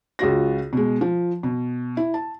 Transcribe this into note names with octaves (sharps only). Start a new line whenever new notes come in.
C#2 F4 F#4 A#6
B2 G#3
F3
B2
E4
A5